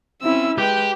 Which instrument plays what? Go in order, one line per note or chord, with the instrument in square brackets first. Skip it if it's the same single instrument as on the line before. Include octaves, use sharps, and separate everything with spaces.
[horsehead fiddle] C4 E4 [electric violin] C#4 E6
[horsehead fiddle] G#3 [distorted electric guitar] G4 [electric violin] B4 G5